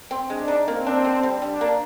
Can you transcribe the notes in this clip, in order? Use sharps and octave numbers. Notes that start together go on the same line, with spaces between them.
C4
G#3 D4
D#4
A#3 C4
D4
D3
G3
G3 D4
A#3